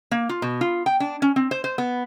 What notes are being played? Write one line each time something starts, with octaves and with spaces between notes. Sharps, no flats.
A#3
F4
B2
F4
G5
D4
C#4
C4
C5
C5
B3